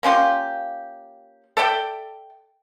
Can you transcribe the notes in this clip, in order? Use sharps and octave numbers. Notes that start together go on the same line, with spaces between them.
A#3 C#4 F4 G4
A4 D5 E5 G5